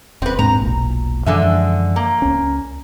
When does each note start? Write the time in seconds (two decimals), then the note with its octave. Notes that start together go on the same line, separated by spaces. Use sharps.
0.22 D#1 C4 B4
0.39 G#2 C4 D4 A#5
0.60 E1 B1 A#2
1.26 F#2 D3 E3 F3 G#3 E5
1.96 A#3
2.22 C#2 C#4